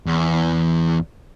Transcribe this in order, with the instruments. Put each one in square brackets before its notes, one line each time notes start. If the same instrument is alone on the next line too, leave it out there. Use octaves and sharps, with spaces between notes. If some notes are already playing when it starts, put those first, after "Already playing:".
[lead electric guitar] E2